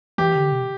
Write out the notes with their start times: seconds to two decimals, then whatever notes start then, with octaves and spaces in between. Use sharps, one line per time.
0.18 E3 G4
0.36 D3
0.52 C3